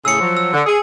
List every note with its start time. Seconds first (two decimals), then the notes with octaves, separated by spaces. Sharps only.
0.05 A2 C#3 G#4 E6 C#7
0.20 F3 F#3
0.37 E6
0.53 D3
0.66 G#4